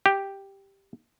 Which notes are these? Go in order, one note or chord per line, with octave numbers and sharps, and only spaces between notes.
G4